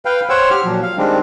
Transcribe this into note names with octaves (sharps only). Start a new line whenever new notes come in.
B4 F5 G5
C5 C#5 F#5 G5 E6
G4 F6
A#2 F3 F#3
F5
D#3 G3 G#3 C4 D4